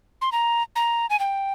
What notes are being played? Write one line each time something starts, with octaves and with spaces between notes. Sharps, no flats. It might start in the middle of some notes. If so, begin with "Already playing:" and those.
C6
A#5
A#5
G#5
G5